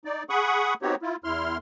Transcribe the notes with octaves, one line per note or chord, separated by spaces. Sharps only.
D#4 D5
G#4 F#5 B5 C#6 D#6
B3 C4 D#4 F#4 G4 C#5
E4 F4
E2 E4 C6 F6